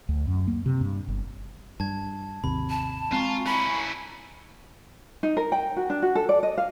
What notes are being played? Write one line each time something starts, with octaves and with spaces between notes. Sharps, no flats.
D2
F#2
A#3
C3
G2
G1
G2 A5 G#6
G#1 D#2 C3 B5
A5
G#3 C4 F4 G#5 A#5 C#6
C#4 E4 B5
D#4
A#4
G5
F#4
D4
F#4
A4
D5
D#5
F5